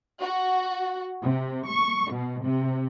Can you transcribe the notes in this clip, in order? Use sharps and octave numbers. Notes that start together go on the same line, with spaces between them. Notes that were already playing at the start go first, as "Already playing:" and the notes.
F#4
C3
C#6
B2
C3